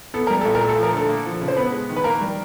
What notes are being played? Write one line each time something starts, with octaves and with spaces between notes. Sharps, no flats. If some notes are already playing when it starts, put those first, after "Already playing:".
B3 A4
G3 A#4
A#2 A4
A#4
A3
A4
F3
A#4
D3 A4
A#3
F3
C#3
C5
B3 B4
G#3
D#3
B4
A#3 A#4
G3